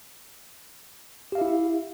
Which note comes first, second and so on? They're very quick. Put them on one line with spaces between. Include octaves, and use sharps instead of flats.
G4 F5 E5 E4